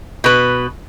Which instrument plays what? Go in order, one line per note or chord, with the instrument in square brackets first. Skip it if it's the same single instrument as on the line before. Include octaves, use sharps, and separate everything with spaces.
[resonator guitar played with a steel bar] B2 B4